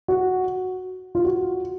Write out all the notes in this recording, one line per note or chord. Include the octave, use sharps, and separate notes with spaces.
F#4
F4
F#4